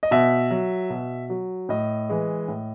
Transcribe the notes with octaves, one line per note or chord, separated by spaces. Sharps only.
D#5
B2 E5
F#3
B2
F#3
A2 D#5
E3 G#3
A2